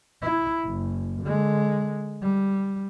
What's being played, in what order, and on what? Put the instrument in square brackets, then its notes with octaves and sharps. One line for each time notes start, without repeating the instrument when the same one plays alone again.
[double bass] E4
F#1
D3 G#3
G3